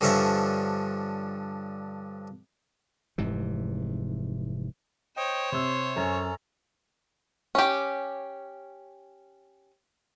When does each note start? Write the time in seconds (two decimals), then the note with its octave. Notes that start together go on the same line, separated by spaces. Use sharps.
0.01 G2 D3 F3 C#4 E5 A#5
3.18 F1 G#2 C3 E3
5.17 C5 C#5 D#5 G5
5.52 C3 C6 E6
5.96 F#2 C#4 A4 A#5
7.55 C#4 G4